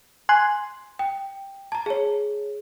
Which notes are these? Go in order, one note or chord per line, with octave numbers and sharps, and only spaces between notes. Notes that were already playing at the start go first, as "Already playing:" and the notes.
G#5 C6 F#6
G5
A5 A#5
G#4 C#5